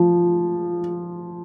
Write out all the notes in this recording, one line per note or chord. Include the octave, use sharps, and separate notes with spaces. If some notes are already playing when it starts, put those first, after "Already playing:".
Already playing: F3